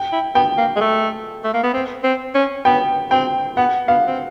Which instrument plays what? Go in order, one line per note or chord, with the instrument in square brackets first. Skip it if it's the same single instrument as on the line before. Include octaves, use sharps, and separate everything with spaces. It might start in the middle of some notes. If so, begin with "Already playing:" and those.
Already playing: [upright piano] G5
[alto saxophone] E4
[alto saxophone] B3 [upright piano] G5
[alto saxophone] A#3
G#3
A3
A3
A#3
B3
C4
C4
C#4
[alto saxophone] B3 [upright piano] G5
[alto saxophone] C4 [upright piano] G5
[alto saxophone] B3 [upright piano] F#5
[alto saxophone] B3 [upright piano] F5
[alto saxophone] C4